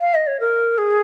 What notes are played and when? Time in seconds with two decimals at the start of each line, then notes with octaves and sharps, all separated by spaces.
0.01 F5
0.14 D#5
0.27 C#5
0.40 A#4
0.78 G#4